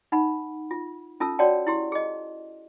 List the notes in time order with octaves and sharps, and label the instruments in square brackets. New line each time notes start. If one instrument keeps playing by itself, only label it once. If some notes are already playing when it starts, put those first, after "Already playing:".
[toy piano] D#4 F#5 B5
F4
C#4 F4 A4 A5 E6
F#4 C#5 D5 F#5 G5 A5
E4 G4 C6
G#4 D#5